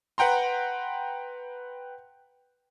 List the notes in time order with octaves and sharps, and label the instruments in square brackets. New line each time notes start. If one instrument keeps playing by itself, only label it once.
[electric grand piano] B4 F#5 G5 A#5 C6